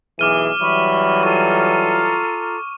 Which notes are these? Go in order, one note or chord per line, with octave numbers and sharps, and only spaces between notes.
B1 E3 G#4 D6 F6 D#7
E3 F#3 G3 E5 B5 C#6
F4 A4 A#5 C#6